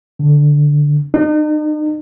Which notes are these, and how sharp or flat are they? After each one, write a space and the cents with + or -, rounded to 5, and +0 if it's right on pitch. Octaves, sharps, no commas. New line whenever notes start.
D3 +0
D#4 -40